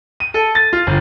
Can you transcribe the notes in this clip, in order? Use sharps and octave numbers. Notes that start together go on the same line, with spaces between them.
D#7
A4
A6
F4
G1